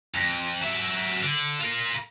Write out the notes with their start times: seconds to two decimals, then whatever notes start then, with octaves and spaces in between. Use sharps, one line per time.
0.14 F2
0.61 F#3 E5
1.23 D3
1.60 F4 A#4